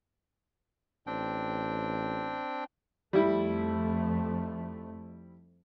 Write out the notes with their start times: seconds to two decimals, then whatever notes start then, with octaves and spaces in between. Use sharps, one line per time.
1.06 A1 C4 D4 G5
3.13 F2 G3 A3 E4